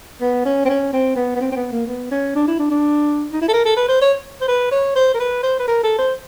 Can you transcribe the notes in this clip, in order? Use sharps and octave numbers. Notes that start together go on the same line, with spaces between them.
B3
C#4
C4
C#4
C4
B3
B3
C4
C4
B3
A#3
B3
C#4
D4
E4
D4
D4
D#4
E4
A4
A#4
A4
B4
C5
C#5
C5
B4
C#5
C5
A#4
B4
C5
B4
A#4
A4
C5